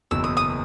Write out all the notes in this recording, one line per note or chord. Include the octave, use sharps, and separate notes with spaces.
F#1 E2 B2 E6
D#6
D#6